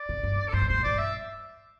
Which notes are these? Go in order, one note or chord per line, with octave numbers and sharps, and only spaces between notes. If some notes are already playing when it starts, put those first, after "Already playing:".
Already playing: D5
C3
G2
A4
G2 C5
A2
G2 C5
A2
G2 D5
E5